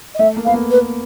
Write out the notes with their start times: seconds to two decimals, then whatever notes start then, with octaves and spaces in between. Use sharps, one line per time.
0.14 D#5
0.19 A3 E5
0.36 A#3
0.45 B3 F5
0.54 A#3
0.71 B4